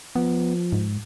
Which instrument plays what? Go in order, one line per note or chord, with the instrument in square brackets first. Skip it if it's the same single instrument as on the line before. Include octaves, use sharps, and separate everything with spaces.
[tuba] F3 [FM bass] B3
[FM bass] G#2